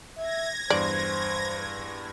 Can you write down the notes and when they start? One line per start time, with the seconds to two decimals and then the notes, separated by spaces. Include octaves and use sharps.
0.18 E5 G#6 A#6
0.70 E2 G2 C5 D5 C6